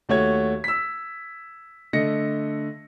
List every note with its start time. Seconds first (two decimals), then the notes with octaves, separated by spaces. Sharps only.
0.09 D#2 A3 F#4 C#5 G#6
0.64 E6 B6
1.93 D3 A3 D#5 A#6 C#7